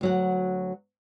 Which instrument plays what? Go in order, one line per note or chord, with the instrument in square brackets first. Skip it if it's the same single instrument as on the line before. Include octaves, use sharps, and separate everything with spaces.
[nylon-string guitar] D2 F#3 F#5